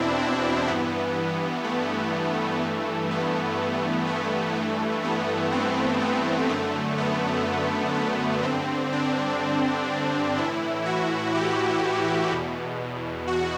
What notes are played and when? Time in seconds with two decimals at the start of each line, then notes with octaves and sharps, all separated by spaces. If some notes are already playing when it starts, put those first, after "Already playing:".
Already playing: E2 B2 C4 D4 E4
0.19 C4
0.68 G2 E3 B3
1.64 A3
2.61 G2 E3
3.11 B3
4.07 A3
4.55 G2 E3
5.04 B3
5.52 C4
6.01 B3
6.49 F#2 D3 A3
6.98 B3
7.94 B3
8.43 G2 D3 C4
8.92 D4
10.37 A2 E3 E4
10.86 F#4
11.34 G4
12.31 E2 B2
13.27 F#4